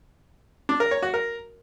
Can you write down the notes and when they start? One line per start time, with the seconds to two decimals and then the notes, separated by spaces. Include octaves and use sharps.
0.69 D4
0.80 A#4
0.91 C#5
1.02 F#4
1.14 A#4